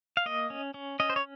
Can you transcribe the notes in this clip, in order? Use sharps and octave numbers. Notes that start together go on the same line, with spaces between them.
F5
A#3 D#5
C#4
C#4
C#4 D#5
C5
C#5